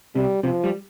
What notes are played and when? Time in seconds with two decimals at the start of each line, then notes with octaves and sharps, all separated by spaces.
0.15 C3 G3
0.43 C3 F3
0.64 G3